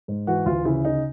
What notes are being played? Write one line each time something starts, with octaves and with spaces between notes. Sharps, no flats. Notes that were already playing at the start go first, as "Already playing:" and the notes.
G#2
E3 F#4
D2 F4
C#3 E4
C#3 D#4